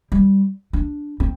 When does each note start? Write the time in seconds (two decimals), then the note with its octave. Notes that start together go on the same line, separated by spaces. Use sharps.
0.12 G3
0.73 D4
1.20 C4